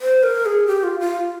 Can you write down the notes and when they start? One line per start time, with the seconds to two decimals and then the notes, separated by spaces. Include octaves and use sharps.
0.01 C5
0.23 A#4
0.46 G#4
0.67 G4
0.83 F4
1.00 F4